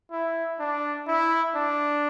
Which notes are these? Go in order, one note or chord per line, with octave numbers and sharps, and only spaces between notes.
E4
D4
E4
D4